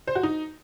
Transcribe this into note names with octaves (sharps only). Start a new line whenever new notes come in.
C5
F#4
D#4